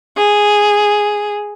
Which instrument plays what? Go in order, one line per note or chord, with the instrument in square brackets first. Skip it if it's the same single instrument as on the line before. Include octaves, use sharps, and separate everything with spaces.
[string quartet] G#4